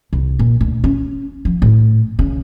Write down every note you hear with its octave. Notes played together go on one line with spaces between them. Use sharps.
C2
A#2
D2
C#4
F3
A2
C#3